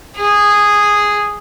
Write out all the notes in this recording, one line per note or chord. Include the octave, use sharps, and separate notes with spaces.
G#4